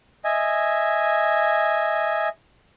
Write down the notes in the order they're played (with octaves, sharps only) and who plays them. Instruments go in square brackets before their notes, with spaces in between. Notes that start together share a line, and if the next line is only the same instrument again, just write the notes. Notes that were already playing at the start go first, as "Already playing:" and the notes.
[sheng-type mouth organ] D#5 E5 G#5